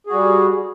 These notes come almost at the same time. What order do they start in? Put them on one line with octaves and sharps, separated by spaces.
G#4 F#4 G3